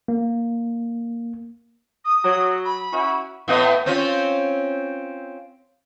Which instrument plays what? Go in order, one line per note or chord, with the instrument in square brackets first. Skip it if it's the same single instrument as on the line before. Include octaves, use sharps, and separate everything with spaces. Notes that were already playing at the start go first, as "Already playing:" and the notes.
[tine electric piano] A#3
[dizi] D#6
[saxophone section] F#3
[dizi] B5
[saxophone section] C#4 E4 F#4
[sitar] A2 B3 D#5
C4 C#4 F4